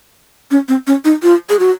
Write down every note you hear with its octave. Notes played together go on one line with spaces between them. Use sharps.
C#4
C4
C#4
D#4
F4
G#4
F#4